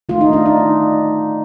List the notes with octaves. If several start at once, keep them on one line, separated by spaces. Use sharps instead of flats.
D#3 A3 F4
D#4
D4
D#4